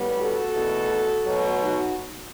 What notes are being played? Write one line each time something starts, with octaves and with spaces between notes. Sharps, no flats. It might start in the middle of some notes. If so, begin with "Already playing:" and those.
Already playing: A2 G3 B3
F#4 A4
E2 B2 A3
B2 F#3 A3
D#4 F#4